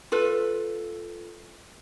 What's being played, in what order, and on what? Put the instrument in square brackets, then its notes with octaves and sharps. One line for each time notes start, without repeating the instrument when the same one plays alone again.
[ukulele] F4 A4 B4